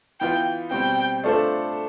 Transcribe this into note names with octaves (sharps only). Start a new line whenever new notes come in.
E3 B3 F4 G5
B2 G3 C4 G5
A3 D4 F4 A4 C5